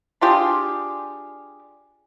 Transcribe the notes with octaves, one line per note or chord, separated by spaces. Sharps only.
D4 F4 G4 G#4